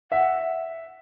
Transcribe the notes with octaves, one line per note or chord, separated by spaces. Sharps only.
E5 F#5